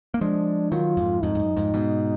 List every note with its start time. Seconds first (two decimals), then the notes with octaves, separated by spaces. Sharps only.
0.14 A#3
0.20 F3 G#3 D4
0.71 D#3 F#3 F4
0.97 F2 G#2
1.23 F2 G#2 D#4
1.35 F2
1.39 F#2
1.56 F2 G#2
1.74 G#2 B2